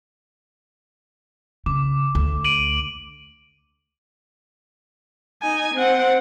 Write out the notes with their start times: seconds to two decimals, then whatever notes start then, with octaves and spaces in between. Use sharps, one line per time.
1.66 C#3 D6
2.15 D2
2.44 D7 D#7 F#7
5.42 D#4 G#5
5.74 C4 F#5